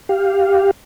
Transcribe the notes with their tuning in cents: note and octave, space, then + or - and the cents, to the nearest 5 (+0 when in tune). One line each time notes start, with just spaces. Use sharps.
G4 +0 F5 +0